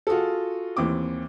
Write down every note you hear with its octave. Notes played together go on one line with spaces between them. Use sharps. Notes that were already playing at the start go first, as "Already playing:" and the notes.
F4 F#4 G#4 A4
D#2 E3 C4 D6